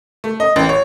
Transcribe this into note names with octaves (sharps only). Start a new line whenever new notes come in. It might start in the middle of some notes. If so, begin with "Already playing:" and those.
A3
D#5
A1
C#5